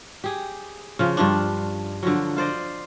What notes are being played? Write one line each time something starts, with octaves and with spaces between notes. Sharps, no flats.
G4 G#4
C#3 F3 F4
G2 F3 D4
D3 F3 F#3
F4 C5 D5 D#5